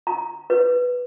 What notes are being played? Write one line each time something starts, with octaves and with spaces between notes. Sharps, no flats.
A#5
B4